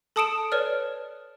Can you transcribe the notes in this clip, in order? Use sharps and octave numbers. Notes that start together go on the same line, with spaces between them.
A4 A5 D#6 C#7 D7 E7
B4 C#5 D5 F6